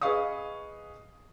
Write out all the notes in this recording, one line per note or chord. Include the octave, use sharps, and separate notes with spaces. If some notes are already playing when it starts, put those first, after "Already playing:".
G#4 B4 D#5 F5 C#6 D#6